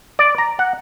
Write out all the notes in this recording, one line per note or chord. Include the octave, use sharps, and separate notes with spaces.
D5
A#5
F#5